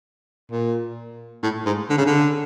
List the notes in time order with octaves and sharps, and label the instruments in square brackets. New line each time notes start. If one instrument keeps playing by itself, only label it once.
[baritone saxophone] A#2
A2
G#2
D3
C#3
D3